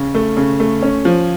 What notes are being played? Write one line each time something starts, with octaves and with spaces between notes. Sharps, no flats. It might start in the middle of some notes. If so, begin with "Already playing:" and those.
Already playing: C#3
A3
C#3
A3
C#4
F3